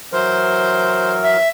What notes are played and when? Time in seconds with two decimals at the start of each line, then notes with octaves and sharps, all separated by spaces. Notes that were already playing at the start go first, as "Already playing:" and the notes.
0.12 E3 F#3 A#4 C5
1.23 E5